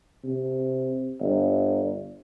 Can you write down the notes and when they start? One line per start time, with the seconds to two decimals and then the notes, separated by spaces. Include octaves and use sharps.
0.24 C3
1.20 G1